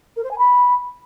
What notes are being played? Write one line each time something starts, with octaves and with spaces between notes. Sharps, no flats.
A#4
C5
G#5
B5